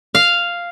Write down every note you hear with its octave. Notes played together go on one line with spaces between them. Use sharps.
F5